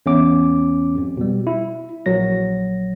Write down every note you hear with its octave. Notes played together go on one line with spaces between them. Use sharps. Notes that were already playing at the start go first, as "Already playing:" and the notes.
E2 C#4 D6
G#1 F2
B2 G3
E4
A#1 F#3 A#6